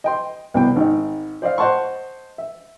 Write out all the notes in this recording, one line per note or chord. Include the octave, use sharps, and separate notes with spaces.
D#5 G5 C6
C2 B2 G5
G#1 D#4
C5 D5 D#5 F5
C5 D#5 F#5 A5 C6 C#6
E5